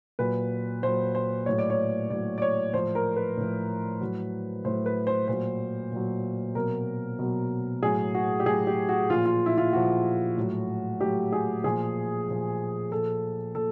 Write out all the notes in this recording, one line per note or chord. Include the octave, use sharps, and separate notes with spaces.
A#2 F#3 B4
A#2 F#3 C5
C5
A2 F#3 C#5
D5
C#5
A2 F#3 D5
D5
C#5
A2 F3 C5
A#4
B4
A2 F3
A2 F#3
A2 F#3 C5
B4
C5
A#2 F#3 C5
A#2 F#3
B2 F#3 A#4
B2 F#3
A2 F#3 G#4
F#4
G4
A2 F#3 G#4
G4
F#4
A#2 F3 F4
F4
E4
F4
A#2 F3 F#4
A2 F#3
A2 F#3 G4
G#4
A#2 F3 G#4
A#2 F3
A#2 F3 A4
A#2 A4